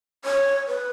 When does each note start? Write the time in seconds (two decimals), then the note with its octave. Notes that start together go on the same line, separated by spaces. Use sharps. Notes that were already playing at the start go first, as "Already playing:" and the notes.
0.25 C#5
0.68 B4